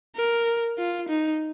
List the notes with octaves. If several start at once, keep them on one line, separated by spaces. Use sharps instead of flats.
A#4
F4
D#4